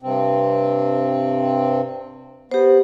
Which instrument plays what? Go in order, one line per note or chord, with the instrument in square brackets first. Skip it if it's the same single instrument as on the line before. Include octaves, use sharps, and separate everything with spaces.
[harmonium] G2 C3 C4
[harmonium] B3 [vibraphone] G4 C5